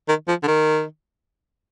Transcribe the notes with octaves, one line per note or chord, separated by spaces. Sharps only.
D#3
F3
D3
D#3